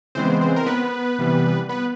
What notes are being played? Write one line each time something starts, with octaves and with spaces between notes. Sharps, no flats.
C#3 E3 G#3 B3 C4 C5
C4 C5
A#4
B3 B4
C3 E3 G3 B3
B3 B4